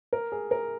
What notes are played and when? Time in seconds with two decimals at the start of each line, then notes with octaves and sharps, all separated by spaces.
0.13 A#4
0.32 G#4
0.51 A#4